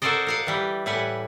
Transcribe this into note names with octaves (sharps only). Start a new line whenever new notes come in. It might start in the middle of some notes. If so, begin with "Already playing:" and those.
F#4 A4 A#4 C5 D5 D#5
A#4 F5 F#5
E3 G3 B4
A2 G3 B4 F#5 G#5